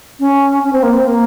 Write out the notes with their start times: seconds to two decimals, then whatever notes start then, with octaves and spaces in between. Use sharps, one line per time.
0.20 C#4
0.63 C#4
0.73 C4
0.83 A#3
0.93 C4
1.07 A#3